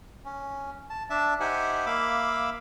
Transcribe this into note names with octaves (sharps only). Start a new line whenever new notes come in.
C#4
A5
D4 E5 A5
D#4 G4 C5 E5 F#5 G#5
A#3 E5 F5 B5 D6 E6